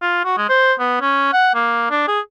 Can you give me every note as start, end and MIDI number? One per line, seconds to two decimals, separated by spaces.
0.02 0.20 65
0.25 0.37 66
0.37 0.45 56
0.49 0.73 72
0.79 1.01 59
1.01 1.30 61
1.33 1.53 78
1.55 1.86 58
1.90 2.04 62
2.08 2.20 68